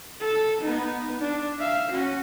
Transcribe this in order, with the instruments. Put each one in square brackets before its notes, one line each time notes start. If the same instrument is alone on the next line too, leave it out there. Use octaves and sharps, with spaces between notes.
[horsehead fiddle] A4
B3 D#4
D4
E5 F5
C#4 F#4